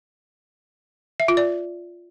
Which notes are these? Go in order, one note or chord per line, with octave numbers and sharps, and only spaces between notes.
E5
F4
D5